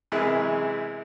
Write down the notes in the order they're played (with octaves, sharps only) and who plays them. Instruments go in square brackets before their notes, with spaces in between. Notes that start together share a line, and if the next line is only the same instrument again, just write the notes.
[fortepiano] F#2 C3 E3 G#3